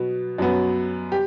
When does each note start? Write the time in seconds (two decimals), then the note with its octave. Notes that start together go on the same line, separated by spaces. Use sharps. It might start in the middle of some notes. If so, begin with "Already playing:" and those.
Already playing: B2 F#3 B3
0.38 F#2 F#3 B3
1.12 G4